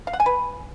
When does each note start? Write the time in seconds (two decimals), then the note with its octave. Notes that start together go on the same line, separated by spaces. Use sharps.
0.07 F5
0.13 F#5
0.20 G#5
0.26 B4